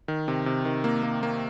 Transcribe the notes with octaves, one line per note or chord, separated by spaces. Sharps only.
D#3
C3
C3
D#3
A#3
A#3
A#3